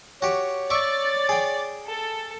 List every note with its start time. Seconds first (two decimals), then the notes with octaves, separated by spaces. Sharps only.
0.22 F#4 G4 C#5
0.70 D5 E5 C#6 D6 A6
1.29 G#4 G5
1.89 A4